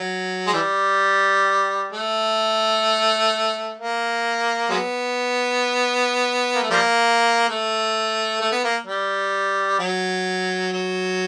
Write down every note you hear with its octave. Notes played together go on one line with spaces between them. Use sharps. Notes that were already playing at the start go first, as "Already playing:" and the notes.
Already playing: F#3
G#3
E3 G3
A3
A#3
F#3 G#3 B3
A#3
A3
F3 G3 A#3
A3
A3
B3
A#3
G3
F#3
F#3